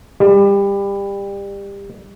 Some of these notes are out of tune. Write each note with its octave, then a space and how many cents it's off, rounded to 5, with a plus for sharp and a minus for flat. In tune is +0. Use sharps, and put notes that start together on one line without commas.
G3 +25